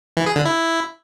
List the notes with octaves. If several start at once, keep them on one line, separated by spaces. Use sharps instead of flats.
E3
G#4
D3
E4